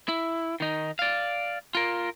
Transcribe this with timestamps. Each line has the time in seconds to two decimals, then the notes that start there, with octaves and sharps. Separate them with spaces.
0.08 E4
0.60 D#3 D#4
0.99 D5 F5
1.75 F4 A#4